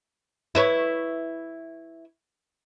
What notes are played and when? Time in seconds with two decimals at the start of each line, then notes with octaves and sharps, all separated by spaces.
0.55 E4 B4 C#5